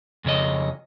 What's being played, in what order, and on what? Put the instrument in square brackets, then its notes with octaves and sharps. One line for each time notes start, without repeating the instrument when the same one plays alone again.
[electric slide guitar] F2 C#3 C#5 D#5